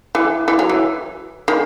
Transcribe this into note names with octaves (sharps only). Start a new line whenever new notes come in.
E3
E3
F#3
E3
D#3